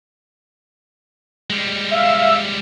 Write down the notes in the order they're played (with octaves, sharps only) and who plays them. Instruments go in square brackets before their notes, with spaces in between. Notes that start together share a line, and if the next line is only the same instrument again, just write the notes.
[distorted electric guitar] G3 G#3
[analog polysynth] E5 F5 E6